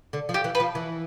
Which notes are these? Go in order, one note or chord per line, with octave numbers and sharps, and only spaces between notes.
D3
F3
G4
E3
B4
F3
E3